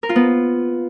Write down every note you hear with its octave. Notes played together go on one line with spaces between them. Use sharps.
A#4
F4
B3